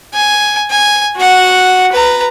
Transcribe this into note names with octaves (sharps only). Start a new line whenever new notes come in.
G#5
G#5
F#4 F#5
B4 A#5